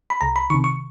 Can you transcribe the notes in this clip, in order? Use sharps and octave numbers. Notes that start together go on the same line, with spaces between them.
B5
C2 A#5
B5
C3 D#3 C#6
C#6